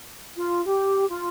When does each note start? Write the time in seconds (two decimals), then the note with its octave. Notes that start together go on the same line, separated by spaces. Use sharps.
0.37 F4
0.65 G4
1.09 F4